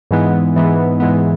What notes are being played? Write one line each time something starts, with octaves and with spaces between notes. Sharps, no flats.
G#2 E3 G#3 B3
G#2 E3 G#3 B3
G#2 E3 G#3 B3